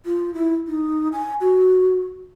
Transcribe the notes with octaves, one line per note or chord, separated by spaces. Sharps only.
F4
E4
D#4
G#5
F#4